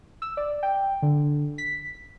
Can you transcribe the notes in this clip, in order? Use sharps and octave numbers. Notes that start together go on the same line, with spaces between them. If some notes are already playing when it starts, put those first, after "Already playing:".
E6
D5
G5
D3
B6